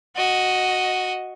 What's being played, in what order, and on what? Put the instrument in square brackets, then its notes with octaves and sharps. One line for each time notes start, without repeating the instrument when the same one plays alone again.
[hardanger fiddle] F#4 D#5